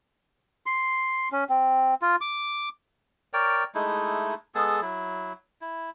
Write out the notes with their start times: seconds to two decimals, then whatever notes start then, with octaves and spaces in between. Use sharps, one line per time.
0.66 C6
1.32 C#4
1.49 C4
2.02 F4
2.21 D6
3.33 A#4 C#5 D5 G5
3.75 G#3 A3 D#4 E4
4.55 G#3 B3 G#4 A4
4.82 F#3 E4
5.61 E4